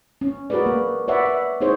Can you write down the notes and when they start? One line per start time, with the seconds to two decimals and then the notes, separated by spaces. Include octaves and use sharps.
0.21 C#4
0.50 F#4 G#4 A#4 B4 D5
0.66 A#3
1.08 B4 C#5 D5 E5 F#5
1.26 E5
1.61 D#4 E4 G#4 C5 C#5